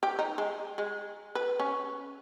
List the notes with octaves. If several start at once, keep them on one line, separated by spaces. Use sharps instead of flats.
G4
D#4
G#3
G#3
B4
C#4